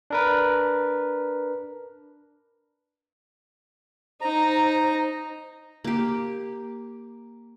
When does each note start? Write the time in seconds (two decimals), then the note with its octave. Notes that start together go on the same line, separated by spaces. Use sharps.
0.10 D4 A#4 B4
4.21 D#4 C5 A#5
5.84 A#3 G4